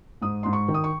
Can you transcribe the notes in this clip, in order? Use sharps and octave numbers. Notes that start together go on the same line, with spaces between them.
G#2 D#6
G#2 C6
C#6
D#3
D#6
C#6